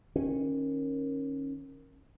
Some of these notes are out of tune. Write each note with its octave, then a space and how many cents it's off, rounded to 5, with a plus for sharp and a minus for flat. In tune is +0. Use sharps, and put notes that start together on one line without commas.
D#3 +0 C#4 -20